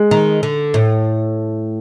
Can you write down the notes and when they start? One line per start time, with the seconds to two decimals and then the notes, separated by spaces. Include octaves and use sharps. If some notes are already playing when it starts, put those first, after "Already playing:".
Already playing: G#3
0.11 D#3
0.43 D3
0.74 A2